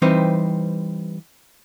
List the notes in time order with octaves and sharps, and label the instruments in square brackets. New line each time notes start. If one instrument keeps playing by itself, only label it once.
[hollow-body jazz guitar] E3 G3 C4 D#4 B4 C5